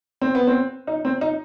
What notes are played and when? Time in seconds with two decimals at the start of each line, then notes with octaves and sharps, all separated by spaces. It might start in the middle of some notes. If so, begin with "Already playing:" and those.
0.22 C4
0.35 B3
0.47 C4
0.87 D#4
1.05 C4
1.21 D#4